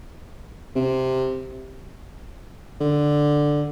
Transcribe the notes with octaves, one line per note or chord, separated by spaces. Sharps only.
C3
D3